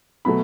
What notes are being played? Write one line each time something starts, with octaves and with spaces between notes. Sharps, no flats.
B2 F#3 A3 B5